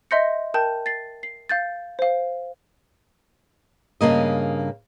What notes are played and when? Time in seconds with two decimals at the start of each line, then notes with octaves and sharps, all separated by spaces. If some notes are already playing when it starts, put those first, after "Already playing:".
0.11 D#5 E5 C6 G6 A#6 C#7
0.54 A#4 G5 A5 G6
0.86 A6 C7
1.23 C7
1.49 F5 G6 A6
1.99 C5 F5
4.01 G2 C#3 A#3 D#5